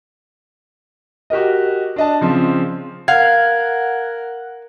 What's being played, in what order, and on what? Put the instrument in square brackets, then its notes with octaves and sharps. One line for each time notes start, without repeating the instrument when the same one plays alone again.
[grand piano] F#4 G4 A#4 D#5
D4 D#5 A5
C#3 F3 C4
[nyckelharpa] A#4 [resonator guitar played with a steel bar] F5 [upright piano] F#5 [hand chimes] G#6